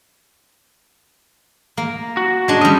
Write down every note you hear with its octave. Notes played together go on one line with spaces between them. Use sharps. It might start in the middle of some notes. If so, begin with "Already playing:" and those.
A#3
F#4
G#3 D4
G3 C#4 D#5